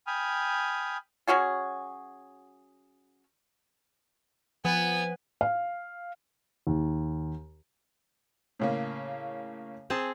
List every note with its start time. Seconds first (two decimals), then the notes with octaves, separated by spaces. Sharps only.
0.07 G5 G#5 B5 D#6 F6
1.28 F#3 C#4 F#4 G#4
4.65 F3 B3 G#5
5.41 F5
6.67 D#2
8.59 A2 C#3 A#3
9.90 C4 G#4 A5